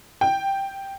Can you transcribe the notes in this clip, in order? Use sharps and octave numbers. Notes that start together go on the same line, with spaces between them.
G5